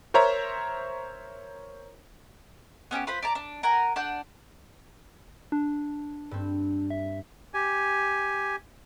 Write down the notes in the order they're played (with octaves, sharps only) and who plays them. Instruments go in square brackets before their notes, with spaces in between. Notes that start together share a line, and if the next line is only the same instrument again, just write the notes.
[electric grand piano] A#4 C5 C#5 E5 A#5
[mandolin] B3 C#4 D#4 G4
F4 B4 C5 B5
D5 A5 A#5
D4
A#4 F#5 G#5 A#5
D4 F#5 G6
[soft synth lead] D4
[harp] G2 C4
[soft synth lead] E5
[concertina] G4 G#5